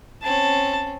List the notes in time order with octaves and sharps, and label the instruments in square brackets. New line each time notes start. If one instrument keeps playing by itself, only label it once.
[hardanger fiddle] C4 C#4 [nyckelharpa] A5